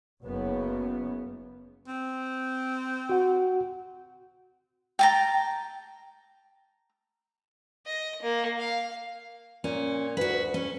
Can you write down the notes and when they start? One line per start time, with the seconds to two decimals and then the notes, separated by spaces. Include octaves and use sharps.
0.23 F#1 F#2 C#3 B3
1.88 C4
3.09 F#4 F#5
4.99 G5 A5 A#5
7.86 D#5
8.22 A#3
8.59 F5
9.64 A#2 C#4
10.17 D2 F#4 B4
10.54 C#4